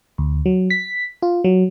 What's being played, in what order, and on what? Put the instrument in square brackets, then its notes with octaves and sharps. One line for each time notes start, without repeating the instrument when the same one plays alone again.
[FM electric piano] D2
F#3
B6
F4
F#3